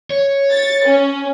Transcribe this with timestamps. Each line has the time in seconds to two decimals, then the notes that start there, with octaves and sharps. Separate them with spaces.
0.10 C#5
0.50 A6
0.84 C#4